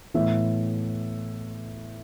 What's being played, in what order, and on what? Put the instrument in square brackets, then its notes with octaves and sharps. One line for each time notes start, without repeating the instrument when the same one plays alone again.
[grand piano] A2 E3 B3 E5